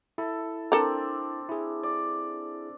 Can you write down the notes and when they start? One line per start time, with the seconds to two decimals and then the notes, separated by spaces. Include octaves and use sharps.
0.18 E4 A4
0.72 C4 D4 A4 A#4
1.49 E4 G#4
1.83 D5